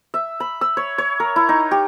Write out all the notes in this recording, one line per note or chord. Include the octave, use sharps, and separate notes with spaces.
E5
B5
E6
C#5
C#5
A#4
E4
D#4
G4